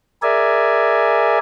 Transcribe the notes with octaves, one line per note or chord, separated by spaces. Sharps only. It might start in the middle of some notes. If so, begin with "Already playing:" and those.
G#4 A#4 D5 E5 G#5